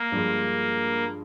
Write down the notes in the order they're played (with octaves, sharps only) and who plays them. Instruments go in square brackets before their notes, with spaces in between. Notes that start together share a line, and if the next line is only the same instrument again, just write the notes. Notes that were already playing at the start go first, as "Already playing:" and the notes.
Already playing: [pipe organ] A#3
[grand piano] G2 F3 G#3